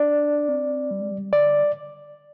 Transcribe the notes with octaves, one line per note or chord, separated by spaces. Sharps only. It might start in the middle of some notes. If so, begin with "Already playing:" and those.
Already playing: D4 D5
C4
G3
G#3
G3
D3 D5